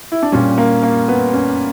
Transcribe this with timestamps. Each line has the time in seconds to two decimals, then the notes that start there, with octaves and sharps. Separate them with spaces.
0.12 E4
0.22 D4
0.32 A#2 G3 C#4
0.58 A#3
0.83 A#3
1.08 B3
1.33 C#4